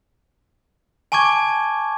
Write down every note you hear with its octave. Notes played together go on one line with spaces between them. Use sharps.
G#5 A5 C#6 D6 G#6